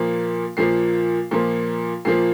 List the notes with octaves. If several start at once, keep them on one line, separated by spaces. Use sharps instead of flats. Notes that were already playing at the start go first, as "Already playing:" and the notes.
Already playing: A#2 F3 A#3
A#2 F3 A#3 C7
A#2 F3 A#3
A#2 F3 A#3 C7